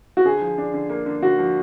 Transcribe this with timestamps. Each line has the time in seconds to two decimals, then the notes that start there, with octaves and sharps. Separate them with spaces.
0.17 F#4
0.25 D3 G#4
0.41 F3
0.58 D4
0.74 D3
0.90 A#3
1.06 D3
1.22 D3 F#4
1.39 F3